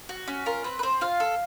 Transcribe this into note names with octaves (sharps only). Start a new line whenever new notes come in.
F#4
C#4
F4 A#4
C4 B4
B4
C4 C5
F4 F5
A4